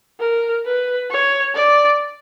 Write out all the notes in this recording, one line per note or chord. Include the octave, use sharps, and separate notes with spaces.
A#4
B4
C#5
D5